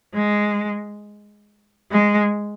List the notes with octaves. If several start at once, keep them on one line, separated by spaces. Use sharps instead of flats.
G#3
G#3